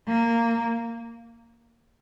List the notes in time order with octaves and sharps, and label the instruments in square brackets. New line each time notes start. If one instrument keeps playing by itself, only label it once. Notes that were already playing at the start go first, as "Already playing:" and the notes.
[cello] A#3